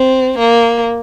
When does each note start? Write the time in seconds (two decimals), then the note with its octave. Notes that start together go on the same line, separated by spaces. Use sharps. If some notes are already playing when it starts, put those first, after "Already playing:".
Already playing: C4
0.39 A#3